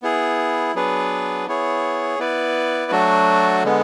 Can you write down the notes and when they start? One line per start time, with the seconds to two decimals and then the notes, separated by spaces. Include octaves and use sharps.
0.02 B3 E4 G#4
0.74 F#3 B3 D4 G#4 B4
1.47 B3 E4 G#4 C#5
2.19 B3 E4 B4 D5
2.91 F#3 A3 D4 F#4
3.64 D3 G#3 B3